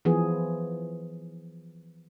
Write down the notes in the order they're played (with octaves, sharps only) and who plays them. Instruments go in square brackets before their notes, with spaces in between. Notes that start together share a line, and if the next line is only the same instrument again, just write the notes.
[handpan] E3 F3 B3 G#4